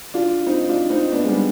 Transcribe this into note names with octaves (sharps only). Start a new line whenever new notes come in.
D4 F4
C4 D#4
D4 F4
C4 D#4
B3 D4
G#3
G3 B3